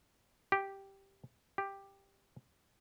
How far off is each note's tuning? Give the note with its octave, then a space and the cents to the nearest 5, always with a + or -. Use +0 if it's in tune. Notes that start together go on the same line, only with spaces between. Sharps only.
G4 -5
G4 +5